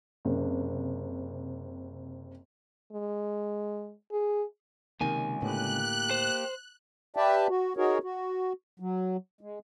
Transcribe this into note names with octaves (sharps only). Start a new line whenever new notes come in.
F#1 C3
G#3
G#4
C#2 C3 D#3 A#3 G#5
A2 D3 A#3 B3 G4 F#6
C5
G4 B4 D5 E5 G5 A5
F#4
D#4 F#4 G#4 A#4 C#5
F#4
F#3
G#3